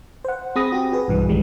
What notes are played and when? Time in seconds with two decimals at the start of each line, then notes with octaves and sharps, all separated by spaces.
0.25 C5 F#5
0.56 C4 G#4 B5 D#6 A#6
0.72 F#4 G4
0.92 F#4 G#4 B4
1.08 B1 G2 E3
1.29 C2 D#3 E3 G3 G#3